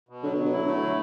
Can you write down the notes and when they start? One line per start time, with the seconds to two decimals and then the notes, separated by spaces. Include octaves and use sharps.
0.09 B2
0.23 D3 F#3
0.34 B2
0.38 F#3
0.45 B2
0.52 D3 E4
0.67 D3 A3
0.83 F#3